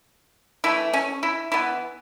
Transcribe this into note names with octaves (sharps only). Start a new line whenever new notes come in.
E3 A3 E4
C#4
E4
E3 B3 E4